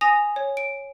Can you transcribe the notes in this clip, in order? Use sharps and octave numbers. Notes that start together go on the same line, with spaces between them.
G#5 D#6 A#6 F7
C#5
D7